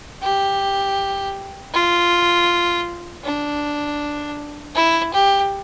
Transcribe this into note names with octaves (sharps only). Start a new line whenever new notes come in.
G4
F4
D4
E4
G4